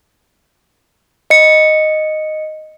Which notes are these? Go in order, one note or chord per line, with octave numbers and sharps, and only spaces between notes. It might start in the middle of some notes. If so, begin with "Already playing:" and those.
D#5 C#7